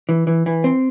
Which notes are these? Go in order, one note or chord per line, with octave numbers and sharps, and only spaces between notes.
E3
E3
E3
C4